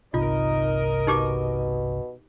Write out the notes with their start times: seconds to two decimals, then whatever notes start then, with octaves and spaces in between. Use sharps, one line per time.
0.14 G1 C2 C3 D#4 F4 A#4 D#5
1.07 B2 D#4 G4 D6